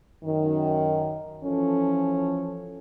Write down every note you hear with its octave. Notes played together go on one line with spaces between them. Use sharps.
F#2 D#3
E3 F3 C#4 A4